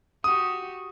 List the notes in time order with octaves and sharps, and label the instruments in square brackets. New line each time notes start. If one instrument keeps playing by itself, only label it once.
[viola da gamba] F#4 G4 [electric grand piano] D#6